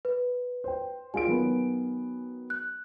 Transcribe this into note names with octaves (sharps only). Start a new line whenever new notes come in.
B4
C5 G5
G#3 F4 G#5 D7
D#3 F#3 B3
F#6